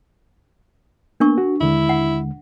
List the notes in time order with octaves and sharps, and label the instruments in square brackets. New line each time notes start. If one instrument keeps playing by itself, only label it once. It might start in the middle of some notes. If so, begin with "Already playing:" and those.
[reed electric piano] A#3 B3 [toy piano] D4 A#4 C#6
[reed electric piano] F#4
[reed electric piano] D#2 D3 G#3 [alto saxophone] E4
[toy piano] F#5